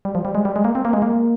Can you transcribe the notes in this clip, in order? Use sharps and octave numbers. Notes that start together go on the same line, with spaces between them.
G3
F3
G3
G#3
G3
G#3
A#3
C4
A#3
G#3
A#3